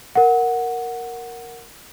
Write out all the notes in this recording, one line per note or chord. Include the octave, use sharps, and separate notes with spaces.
A#4 F#5